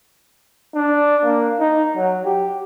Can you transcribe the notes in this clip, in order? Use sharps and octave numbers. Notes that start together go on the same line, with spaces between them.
D4
A#3
D#4
F#3
G4